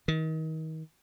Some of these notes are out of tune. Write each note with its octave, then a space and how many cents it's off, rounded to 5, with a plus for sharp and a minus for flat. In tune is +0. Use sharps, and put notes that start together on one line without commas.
D#3 +35